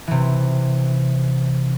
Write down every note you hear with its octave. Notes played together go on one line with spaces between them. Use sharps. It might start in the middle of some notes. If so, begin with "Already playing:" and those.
C3 E3